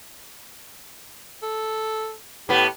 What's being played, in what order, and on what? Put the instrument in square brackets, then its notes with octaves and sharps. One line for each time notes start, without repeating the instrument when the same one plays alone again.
[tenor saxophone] A4
[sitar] A2 B3 [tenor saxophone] G4